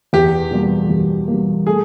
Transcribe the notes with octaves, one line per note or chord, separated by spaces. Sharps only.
E2 G4
B2 G3 A#3
E2
B2 G3 A#3
A3 G#4